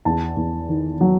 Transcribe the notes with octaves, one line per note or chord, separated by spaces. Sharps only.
E2 A5
E2
D#3
F#3